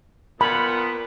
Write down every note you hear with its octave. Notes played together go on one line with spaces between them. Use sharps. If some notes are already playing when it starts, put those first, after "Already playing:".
A#2 B3 B5